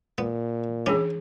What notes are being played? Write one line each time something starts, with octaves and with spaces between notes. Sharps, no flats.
A#2 B3
E3 C#4 D4 G#4